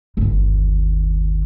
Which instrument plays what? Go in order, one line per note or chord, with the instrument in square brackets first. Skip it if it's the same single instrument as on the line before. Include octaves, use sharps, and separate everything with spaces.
[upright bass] G1 D#2